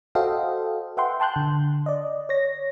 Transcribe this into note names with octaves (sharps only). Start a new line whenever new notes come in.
F#4 A4 C5 D#5 F5 G5
B4 E5 F#5 G5 C6
G5 A5 C6 F#6 G6
D3
D5 D#5
C#5 A#6